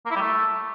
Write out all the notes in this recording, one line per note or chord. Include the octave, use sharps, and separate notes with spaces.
A#3
E4
G3
A3